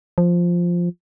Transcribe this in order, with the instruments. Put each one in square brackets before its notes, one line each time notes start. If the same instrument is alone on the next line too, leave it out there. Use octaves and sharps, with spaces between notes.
[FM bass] F3